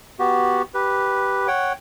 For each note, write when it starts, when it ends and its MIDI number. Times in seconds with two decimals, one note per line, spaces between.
0.19 0.62 59
0.19 0.62 66
0.19 0.62 67
0.74 1.47 67
0.74 1.47 71
1.47 1.73 73
1.47 1.73 78
1.47 1.73 79